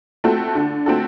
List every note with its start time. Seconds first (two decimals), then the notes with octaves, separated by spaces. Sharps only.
0.24 A3 C4 F#4 A4
0.55 D3
0.86 A3 C4 F#4 A4